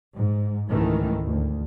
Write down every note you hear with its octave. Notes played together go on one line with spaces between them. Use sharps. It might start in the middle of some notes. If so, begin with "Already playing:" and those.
G#2
C#2 G#2 D#3 E3 A3
D2